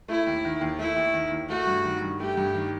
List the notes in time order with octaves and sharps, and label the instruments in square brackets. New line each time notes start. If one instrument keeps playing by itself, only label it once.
[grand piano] A3 [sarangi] E4
[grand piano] D#2
D#3
D#2
[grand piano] A3 [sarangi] E4
[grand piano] D#2
D#3
D#2
[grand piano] A3 [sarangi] F#4
[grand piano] G2
D#3
G2
[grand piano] A3 [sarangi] G4
[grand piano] G2
D#3